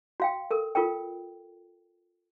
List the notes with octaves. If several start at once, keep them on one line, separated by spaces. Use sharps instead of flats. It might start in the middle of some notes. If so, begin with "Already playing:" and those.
F#4 F5 G5
A4 A#4
F4 A4 A#4 G5